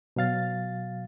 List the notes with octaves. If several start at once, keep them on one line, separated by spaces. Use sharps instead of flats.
B2 F#3 F5 A6